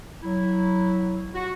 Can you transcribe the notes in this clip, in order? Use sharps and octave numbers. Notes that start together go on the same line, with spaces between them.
F#3 E4
F#4